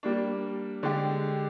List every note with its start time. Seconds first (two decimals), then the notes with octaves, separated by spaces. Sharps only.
0.03 G3 A#3 D4
0.83 D3 G#3 D4 G4